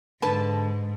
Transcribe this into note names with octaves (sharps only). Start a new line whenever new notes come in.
G#2 D3 B4 A5